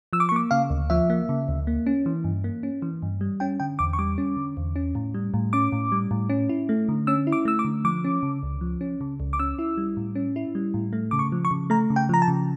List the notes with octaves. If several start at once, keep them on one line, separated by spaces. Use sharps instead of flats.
F3 E6
D6
C#6
A#3 D6
C#3 F5
D2
F3 E5
A#3
C#3
D2
A#3
C#4
E3
G2
A#3
C#4
E3
G2
G3
C#4 G5
D3 G5
E2 D6
C#6
G3 D6
C#4
D3
E2
C#4
A2
G3
A2
C#4 D6
A2
G3
A2
C#4
E4
A3
D3
C#4 E6
E4
D6
A3 E6
D6
D3
F3 D6
C#4
C#3
C#2
F3
C#4
C#3
C#2
D6
C#4 E6
E4
G3
A2
C#4
E4
G3
A2
A3
C#3 D6
C#6
F3
C#6
C#3
A3 A#5
C#3
G5
F3 A#5
A5
C#3